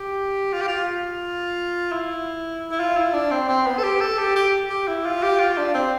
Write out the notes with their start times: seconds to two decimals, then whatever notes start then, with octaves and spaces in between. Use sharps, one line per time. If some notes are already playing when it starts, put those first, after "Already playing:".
Already playing: G4
0.53 F4
0.62 G4
0.68 F4
1.92 E4
2.71 E4
2.80 F4
2.97 E4
3.14 D4
3.31 C4
3.48 C4
3.66 B3
3.78 A4
3.83 G4
4.00 A4
4.18 G4
4.36 G4
4.70 G4
4.88 E4
5.06 F4
5.23 G4
5.40 F4
5.58 D4
5.74 C4